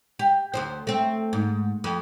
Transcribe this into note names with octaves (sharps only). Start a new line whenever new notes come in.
G4
D2 G#2 C5
A3 C4
G#2
F2